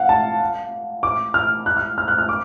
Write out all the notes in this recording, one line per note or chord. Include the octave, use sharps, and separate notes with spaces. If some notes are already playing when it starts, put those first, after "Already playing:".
Already playing: F5 F#5
A5
D6
F6
F#6
F6
F6
F#6
F6
D6